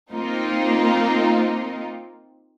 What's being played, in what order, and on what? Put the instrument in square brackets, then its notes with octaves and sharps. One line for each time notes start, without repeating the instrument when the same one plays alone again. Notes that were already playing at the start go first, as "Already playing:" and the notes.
[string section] A#3 C4 D#4 F4